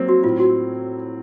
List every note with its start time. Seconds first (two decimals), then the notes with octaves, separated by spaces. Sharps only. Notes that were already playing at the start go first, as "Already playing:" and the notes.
Already playing: F#3 A#3 C4
0.09 F#4
0.24 A2 F4
0.40 F#4